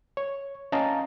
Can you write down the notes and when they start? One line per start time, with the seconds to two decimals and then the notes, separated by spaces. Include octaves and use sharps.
0.17 C#5
0.72 C#4 D#5 F5 A5 A#5